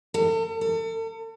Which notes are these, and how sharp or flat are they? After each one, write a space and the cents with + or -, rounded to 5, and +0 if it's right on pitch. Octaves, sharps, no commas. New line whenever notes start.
A4 +40
A4 +40